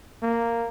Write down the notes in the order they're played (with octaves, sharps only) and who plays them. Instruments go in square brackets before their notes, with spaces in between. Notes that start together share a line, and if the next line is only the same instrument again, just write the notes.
[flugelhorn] A#3